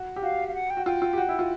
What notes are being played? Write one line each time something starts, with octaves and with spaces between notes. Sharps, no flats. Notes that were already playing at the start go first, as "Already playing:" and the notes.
Already playing: F#4
G4
F#4 F5
F5
F#5
G5
F#4
F4 G5
F4
G4
F#4
E4
F4